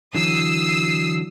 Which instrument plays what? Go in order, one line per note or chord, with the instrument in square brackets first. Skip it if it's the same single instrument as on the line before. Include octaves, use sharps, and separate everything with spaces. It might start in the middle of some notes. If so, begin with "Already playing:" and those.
[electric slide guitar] D3 E3 F#3 [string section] D#6 E6 C7